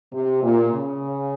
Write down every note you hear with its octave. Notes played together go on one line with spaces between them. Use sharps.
C3
A#2
C#3